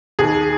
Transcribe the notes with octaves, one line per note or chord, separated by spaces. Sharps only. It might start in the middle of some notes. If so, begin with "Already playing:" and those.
D#2 G#4